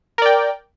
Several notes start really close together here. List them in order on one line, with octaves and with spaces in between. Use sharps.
A#4 D5 G5